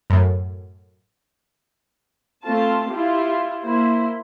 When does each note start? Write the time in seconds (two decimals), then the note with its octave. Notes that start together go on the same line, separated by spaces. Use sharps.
0.10 F#2 A2
2.43 A3 C4 F4 A5
2.88 E4 F4 G4
3.62 A#3 E4 C5